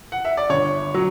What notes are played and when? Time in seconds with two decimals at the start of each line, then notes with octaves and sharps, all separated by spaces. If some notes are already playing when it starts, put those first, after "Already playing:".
0.12 F#5
0.25 E5
0.37 D5
0.50 G1 C#5
0.94 F#3